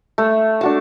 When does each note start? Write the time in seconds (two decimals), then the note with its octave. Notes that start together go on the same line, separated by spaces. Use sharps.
0.18 A3
0.61 D4 F#4 A5